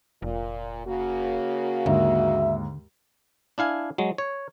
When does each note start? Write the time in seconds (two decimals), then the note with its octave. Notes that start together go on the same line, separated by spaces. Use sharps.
0.22 F1 A#2
0.86 C#3 A#3 F#4
1.86 D#2 G#2 D3 E5
3.58 D4 E4 F5 G#5
3.98 F#3 G#3
4.18 C#5